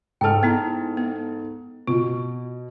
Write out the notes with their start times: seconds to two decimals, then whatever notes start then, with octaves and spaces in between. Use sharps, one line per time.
0.21 G#2 A4 G5 A5 F6
0.43 B3 E4 A#5
0.97 B3
1.87 B2 F4